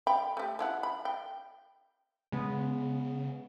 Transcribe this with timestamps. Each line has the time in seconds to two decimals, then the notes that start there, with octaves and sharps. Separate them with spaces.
0.07 G5 B5
0.37 A3 G4
0.59 F3 E4 F#5
0.83 B5
1.05 G5
2.32 C#3 G#3 B3